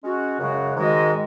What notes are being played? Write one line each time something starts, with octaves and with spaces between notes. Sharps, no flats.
G#3 C#4 F#4
F#2 C#3 G#3 F#4
G#2 D#3 G#3 F#4 D#5